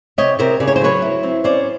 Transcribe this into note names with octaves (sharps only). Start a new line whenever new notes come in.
C3 C#5 D#5
C3 A#4 C5
C#3 D5
C#5
C5
F#3 B4 C#5
E4
C4
C#4 C5 D5